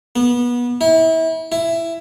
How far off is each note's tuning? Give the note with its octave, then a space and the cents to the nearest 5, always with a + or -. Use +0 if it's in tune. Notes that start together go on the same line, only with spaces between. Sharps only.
B3 -25
E4 -30
E4 +15